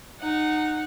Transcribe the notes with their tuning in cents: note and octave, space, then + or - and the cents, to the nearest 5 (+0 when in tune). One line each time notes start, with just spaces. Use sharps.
D#4 -20 F#5 -5